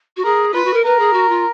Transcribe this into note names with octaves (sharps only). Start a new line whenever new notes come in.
F#4
G#4 A#4
F4 B4
F#4
A#4
A#4 B4
G#4
F#4
F4